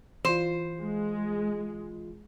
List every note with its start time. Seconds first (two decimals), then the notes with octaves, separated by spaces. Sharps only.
0.25 E3 F4 C5
0.83 G#3